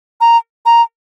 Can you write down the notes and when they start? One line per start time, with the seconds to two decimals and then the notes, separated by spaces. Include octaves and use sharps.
0.21 A#5
0.66 A#5